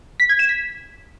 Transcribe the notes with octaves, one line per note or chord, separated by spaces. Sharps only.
B6
G#6
E7
B6